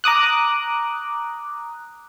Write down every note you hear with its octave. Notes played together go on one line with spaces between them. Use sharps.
A#5 D6 D#6 F#6